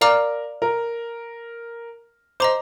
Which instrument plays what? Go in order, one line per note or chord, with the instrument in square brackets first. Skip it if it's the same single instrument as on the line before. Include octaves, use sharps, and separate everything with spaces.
[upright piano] A#4 [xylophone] D5 F5 A#5 D6 F6
[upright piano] A#4
[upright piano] C5 [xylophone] D#5 A#5 D6